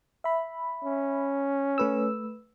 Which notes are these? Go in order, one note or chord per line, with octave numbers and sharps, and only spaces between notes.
E5 B5
C#4
A3 B4 E6